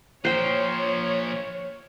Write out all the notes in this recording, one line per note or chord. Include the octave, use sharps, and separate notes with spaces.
A#2 F3 C5 C#5 G5